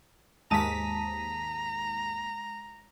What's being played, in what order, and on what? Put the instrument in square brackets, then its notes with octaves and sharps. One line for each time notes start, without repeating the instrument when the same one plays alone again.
[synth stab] D#2 G#2 B6 [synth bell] G#3 A5 D#7 [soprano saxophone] A#5